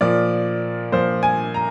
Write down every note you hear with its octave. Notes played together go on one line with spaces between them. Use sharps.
A#2 F3 D5
A#2 F3 C5
G#5
A#5